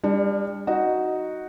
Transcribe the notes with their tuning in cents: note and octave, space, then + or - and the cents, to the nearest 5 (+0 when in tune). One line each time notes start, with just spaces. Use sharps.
G3 +35 D4 +0
D#4 +5 F#4 +0